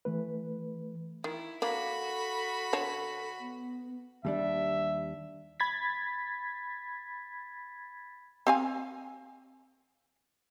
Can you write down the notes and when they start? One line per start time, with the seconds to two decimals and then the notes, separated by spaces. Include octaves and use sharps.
0.05 E3 A3 B4
1.24 D#3 E4
1.62 A#3 D4 F#4 A4 B5
2.73 D3 C#5 A5
3.40 B3
4.25 D#2 G3 D4 E5
5.60 B5 G#6 A6 B6
8.47 C4 F5 G#5